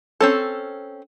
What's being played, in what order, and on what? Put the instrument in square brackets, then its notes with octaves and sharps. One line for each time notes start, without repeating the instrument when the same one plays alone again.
[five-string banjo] C4 C#4 A4